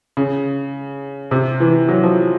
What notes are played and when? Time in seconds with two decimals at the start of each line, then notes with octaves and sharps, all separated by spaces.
0.17 C#3
1.31 C3
1.60 E3
1.89 F#3
2.04 F3